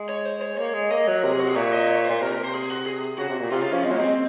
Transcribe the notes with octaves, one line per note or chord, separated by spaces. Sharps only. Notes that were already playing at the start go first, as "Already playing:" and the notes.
Already playing: G#3
C#5
C5
C#5
A#3 C#5
G#3
A#3 D#5
F#3 C#5
C3 A#4
G#4
F#4
G#4
A#2 C#5
D#5
C#5
C5
A#2
C3 A#4
A#4
C3
C5
G#4
F#4
G#4
C#3 F#4
C3
A#2
C3 F4
C#3 F4
F3 C#4
G#3 C4
F#3 A#3
G#3 C4